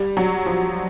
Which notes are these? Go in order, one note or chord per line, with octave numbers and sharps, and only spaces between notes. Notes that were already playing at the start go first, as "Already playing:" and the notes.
Already playing: G3
F#3
F3